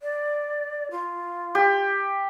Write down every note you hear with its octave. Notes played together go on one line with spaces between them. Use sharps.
D5
F4
G4